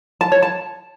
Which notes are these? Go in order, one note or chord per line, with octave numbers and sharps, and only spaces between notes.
A5
C#5
A5